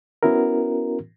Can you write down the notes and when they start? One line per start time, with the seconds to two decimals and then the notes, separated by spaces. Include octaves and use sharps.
0.23 B3 C#4 E4 F#4 A#4